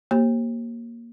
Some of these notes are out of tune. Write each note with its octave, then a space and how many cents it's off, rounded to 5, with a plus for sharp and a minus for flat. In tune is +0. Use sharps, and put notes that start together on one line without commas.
A#3 +0 G4 -10 C5 +45